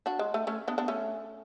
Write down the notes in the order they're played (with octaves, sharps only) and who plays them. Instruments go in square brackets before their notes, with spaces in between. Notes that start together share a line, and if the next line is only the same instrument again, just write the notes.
[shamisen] D4 F#4
G#3
A3
A3 C#4
B3 D4
B3 D4
A3 C#4